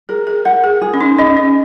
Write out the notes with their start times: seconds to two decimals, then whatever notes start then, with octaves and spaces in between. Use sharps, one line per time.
0.09 G#4 A#4
0.27 G#4
0.45 A#4 F#5
0.64 G#4
0.82 G#4
0.94 C#4
1.01 D#4
1.18 C#4 D#5
1.37 C#4